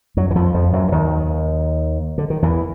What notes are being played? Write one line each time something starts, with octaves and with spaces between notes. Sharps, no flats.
F#2 F#3
E3
F2 F3
F2 F3
F#2 F#3
E3
D#2 D#3
D3
D#3
E2 E3